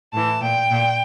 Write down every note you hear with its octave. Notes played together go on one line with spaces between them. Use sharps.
A2 E3 A5
A#2 G5
A#2